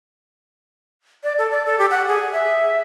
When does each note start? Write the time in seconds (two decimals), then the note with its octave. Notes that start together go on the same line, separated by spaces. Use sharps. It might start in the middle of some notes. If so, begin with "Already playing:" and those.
1.23 D5
1.38 A4
1.51 D5
1.66 A4
1.79 G4
1.91 F#5
2.07 G#4
2.32 E5